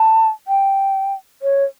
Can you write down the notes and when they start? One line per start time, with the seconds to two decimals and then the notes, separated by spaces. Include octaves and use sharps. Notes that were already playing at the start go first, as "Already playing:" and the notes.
Already playing: A5
0.48 G5
1.42 C#5